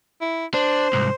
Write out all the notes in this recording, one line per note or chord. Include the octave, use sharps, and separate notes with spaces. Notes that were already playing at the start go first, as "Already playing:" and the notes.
E4
D4 C5
C2 G#2